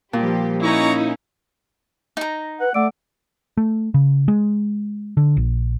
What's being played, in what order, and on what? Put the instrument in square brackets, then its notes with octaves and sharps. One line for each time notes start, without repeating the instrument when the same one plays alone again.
[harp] A#2 [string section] F3 G3 G4
[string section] C#4 [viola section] D#4 E4 [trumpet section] C#5 A#5 C#6
[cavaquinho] D#4 A#5
[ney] B4 [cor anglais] F#5
[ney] A3 [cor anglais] D5 [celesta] F#5 E6 D7
[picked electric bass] A3
C#3
G#3
D3
A#1